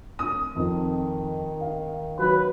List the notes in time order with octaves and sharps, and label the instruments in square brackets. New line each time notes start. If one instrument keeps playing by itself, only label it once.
[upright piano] D#6
[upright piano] F2 [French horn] D#3
[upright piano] F5
[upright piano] F#3 [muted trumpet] B4